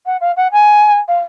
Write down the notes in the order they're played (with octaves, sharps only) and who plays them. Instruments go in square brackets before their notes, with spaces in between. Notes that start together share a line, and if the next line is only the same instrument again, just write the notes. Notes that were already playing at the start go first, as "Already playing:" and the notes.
[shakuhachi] F#5
F5
F#5
G#5
F5